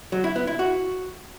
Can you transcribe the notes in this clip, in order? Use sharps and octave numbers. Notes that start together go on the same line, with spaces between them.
F#3
E4
B3
E4
F#4